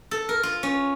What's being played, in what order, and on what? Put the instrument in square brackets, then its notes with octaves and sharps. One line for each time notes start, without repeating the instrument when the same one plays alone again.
[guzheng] A4
A#4
F4
C#4